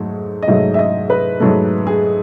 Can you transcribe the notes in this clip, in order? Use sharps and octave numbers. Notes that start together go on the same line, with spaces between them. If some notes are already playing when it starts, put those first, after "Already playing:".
Already playing: G#2 F#3 A3
D#5
G#2 F#3 A3 E5
E5
D#5
B4
G#2 F#3 A3 A4
G#4